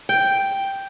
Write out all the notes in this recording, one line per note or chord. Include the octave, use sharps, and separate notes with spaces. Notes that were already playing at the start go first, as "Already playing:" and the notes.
G5